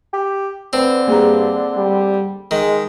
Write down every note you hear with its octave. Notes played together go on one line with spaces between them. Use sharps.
G4
D3 C4 B4
G2 A#3 G#4 A#5
G3
D#3 G#3